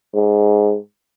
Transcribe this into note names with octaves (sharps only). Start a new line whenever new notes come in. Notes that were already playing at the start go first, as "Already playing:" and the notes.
G#2